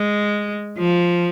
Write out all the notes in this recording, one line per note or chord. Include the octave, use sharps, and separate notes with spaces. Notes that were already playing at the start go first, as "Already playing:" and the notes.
Already playing: G#3
F3